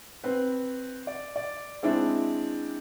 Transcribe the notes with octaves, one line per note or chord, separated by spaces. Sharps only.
C4 B4
D5
D5
G#3 C4 D4 E4